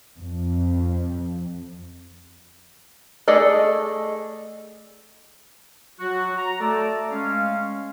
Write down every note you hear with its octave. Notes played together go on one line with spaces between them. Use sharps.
F2
A3 G#4 A4 D5 D#5
F#3 F#4
A#5
A3 A4 D5
G#3 C#4 F5